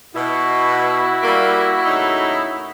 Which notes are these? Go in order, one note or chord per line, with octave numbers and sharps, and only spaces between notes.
B2 E4 F#4
G3 A#3
A2 C#3 D#4